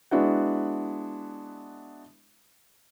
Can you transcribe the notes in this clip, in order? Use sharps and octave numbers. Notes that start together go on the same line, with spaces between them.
G#3 B3 D4 E4 F#4